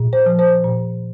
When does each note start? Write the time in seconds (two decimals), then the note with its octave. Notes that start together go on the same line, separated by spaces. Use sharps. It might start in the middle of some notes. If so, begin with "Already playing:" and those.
Already playing: A#2
0.13 C5
0.26 F3
0.39 C5
0.64 A#2